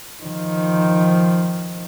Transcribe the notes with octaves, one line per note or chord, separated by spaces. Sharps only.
D#3 F3